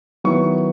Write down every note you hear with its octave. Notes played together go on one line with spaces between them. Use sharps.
D#3 F#3 B3 E4 C#6